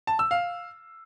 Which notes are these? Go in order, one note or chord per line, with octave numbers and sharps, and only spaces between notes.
A5
E6
F5